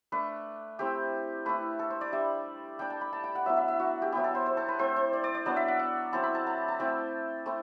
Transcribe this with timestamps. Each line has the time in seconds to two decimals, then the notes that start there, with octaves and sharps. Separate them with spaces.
0.12 A3 D4 B4
0.79 A3 C4 E4 G4
1.46 A3 E4 B4
1.79 A4
1.90 C5
2.01 D5
2.12 G3 D4 E5
2.79 G3 D4 G5
2.90 A5
3.01 B5
3.13 A5
3.24 G5
3.35 F#5
3.46 F#3 B3 E4 E5
3.57 E5
3.68 E5
3.80 F#4
4.02 G4
4.12 F#3 B3 E4 G4
4.24 A4
4.35 C5
4.46 C5
4.57 A4
4.68 B4
4.79 A3 C4 E4 C5
4.96 C5
5.13 D5
5.24 D5
5.35 D5
5.46 F#3 B3 D4 D5
5.56 E5
5.68 F#5
5.79 F#5
6.13 F#3 C4 E4 A5
6.23 B5
6.35 A5
6.46 A5
6.68 A5
6.79 A3 C4 E4 G5
7.46 A3 C4 E4